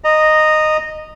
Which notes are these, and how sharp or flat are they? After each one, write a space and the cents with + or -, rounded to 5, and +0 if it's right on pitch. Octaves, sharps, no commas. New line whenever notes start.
D#5 -10 A#5 +0